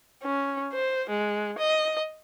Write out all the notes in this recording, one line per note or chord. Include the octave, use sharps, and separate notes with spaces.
C#4
C5
G#3
D#5